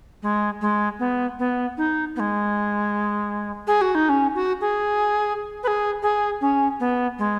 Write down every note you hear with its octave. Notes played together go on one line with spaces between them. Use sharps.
G#3
G#3
B3
B3
D#4
B3
G#3
G#4
F#4
D#4
C#4
F#4
G#4
B4
G#4
G#4
C#4
B3
G#3